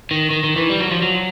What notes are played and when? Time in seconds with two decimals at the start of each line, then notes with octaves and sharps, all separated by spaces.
0.11 D#3
0.30 D#3
0.44 D#3
0.56 E3
0.69 G3
0.80 F#3
0.91 F3
1.02 F#3